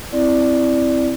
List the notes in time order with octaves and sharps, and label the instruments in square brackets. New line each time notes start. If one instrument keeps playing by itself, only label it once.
[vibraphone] C4 E4 D5